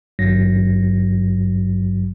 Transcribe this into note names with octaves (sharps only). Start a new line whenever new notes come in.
G#1 G2 F#3 A#6